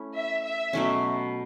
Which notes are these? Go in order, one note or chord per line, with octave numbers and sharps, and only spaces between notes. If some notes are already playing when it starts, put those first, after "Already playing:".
Already playing: A3 C#4 E4 B4
E5
E5
B2 F#3 A3 C#4